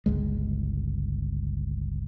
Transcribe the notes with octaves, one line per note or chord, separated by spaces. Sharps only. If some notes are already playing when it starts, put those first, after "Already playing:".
G1 C#2 G#3